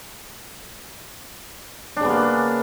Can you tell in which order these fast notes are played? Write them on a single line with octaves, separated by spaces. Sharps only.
D4 C#3 B3 A#3